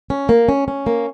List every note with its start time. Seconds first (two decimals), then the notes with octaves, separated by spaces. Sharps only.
0.10 C#4
0.29 A#3
0.49 C#4
0.68 C#4
0.87 A#3